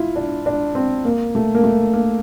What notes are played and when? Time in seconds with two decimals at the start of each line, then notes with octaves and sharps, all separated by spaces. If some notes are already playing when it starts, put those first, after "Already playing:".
Already playing: E4 F4
0.16 D4
0.46 D4
0.75 C4
1.05 A#3
1.35 A3
1.55 A#3
1.64 A3
1.93 A#3